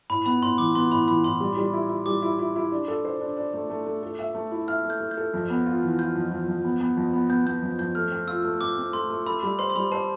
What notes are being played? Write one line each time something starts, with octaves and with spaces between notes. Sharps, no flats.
A2 B5
B3 B5
A2 C6
E3 D6
B3 C6
A2 B5
E3 B5
A2 C6
G3
G3
E4
E4
G3 D6
E4
E4
E4
D4
A4
C5
D4
D4
A3
A3
A3
A4
E5
A3
E4
E5 F6
A3
G6
A3
G6
A4
F2
B3
F4
E3
F4 G6
F2
F2
F2
B3
B3
F2
B3
B3 G6
B3 G6
F2
F2 G6
A3 F6
C4
F4 E6
A3
C4 D6
C4
A3 C6
A3
A4 B5
G3 B5
C5 C6
C6
G3 B5
C5 A5